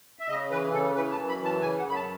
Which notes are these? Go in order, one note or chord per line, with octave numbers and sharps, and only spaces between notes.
E5
C#3 D#5
E3 B4
C#3 A4
E3 B4
A5
F#2
B5
E3
A5
C#3 G#5
F#5
F#2
B5
A5